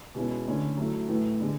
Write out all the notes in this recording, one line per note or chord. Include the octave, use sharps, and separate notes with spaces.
B2 G#3 C#4 E4
D3 A3 C#4 E4
F#3 A3 E4
A2 E3 A3
D3 G#3